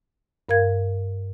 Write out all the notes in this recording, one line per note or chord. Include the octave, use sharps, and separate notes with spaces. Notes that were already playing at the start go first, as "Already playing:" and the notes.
G2 A#4 F5 G#6